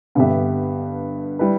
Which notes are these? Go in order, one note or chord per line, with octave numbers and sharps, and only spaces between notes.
G2 D3 B3 G4 E5
G3 E4 B4